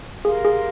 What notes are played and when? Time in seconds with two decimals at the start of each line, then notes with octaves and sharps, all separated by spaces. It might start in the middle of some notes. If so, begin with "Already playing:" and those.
0.25 G4 G#4 A#4 F5 C6
0.45 G#4